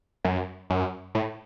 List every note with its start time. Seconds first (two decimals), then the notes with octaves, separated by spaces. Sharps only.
0.24 F#2
0.70 F#2
1.15 A2